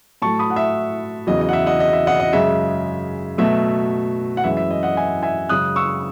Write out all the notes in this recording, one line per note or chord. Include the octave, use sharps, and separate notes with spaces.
A2 F#3 A3 A5 C#6
B5 D#6
F#5
E5
E2 C#3 F#3 D#5
D#5
F#5
E5
D#5 F#5
D#5
E5
D#5 F#5
D#5
F#2 C#3 G#3 E5
B2 F#3 A3 E5
F#5
F#2 E3 G#3 E5
E5
D#5
D#5 F#5
E5 G#5
E5 G#5
F#2 C#3 G#3 D#6 F#6
C#6 E6